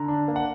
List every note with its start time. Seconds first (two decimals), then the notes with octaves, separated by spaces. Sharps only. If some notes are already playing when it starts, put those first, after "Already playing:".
Already playing: D3 A#5
0.08 D4
0.28 A#3
0.36 F#5